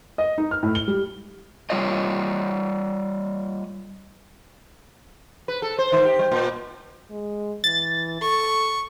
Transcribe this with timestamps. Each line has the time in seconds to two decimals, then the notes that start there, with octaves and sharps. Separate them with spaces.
0.18 D#5
0.38 D#4
0.51 F6
0.63 A2
0.75 G7
0.88 G3
1.70 G3 F4 C#5 D#5
5.48 B4
5.62 A4
5.79 C5
5.92 D#3
6.05 G4
6.19 G3
6.32 A#2
7.11 G#3
7.64 E3 A6
8.21 A4 C#6